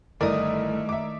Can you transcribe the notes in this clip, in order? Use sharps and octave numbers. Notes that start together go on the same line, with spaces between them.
G1 D#3 A3 E4 A#4 D5 D#6
E5 D6